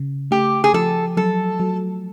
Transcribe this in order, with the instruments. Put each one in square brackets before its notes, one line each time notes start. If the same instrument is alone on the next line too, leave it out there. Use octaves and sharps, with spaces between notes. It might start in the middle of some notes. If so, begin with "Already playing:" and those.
Already playing: [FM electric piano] C#3
[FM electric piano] A3 [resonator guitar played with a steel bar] G4
[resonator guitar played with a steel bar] G#4
[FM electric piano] F3 [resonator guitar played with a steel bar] A4
[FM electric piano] F#3 [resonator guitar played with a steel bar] A4
[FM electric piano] F#3